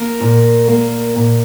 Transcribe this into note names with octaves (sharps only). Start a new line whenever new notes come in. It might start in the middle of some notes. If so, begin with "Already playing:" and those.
Already playing: A#3 A#4
A#2
A#3
A#2